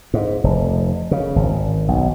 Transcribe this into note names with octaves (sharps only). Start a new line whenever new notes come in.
G#2
F1
C#3
G#1
B1